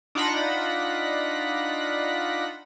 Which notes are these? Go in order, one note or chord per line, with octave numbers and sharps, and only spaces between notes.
D4 D#4 F4 F#5 B5 A#6